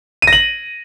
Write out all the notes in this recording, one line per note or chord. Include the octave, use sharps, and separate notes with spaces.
D#7
A#6
F#7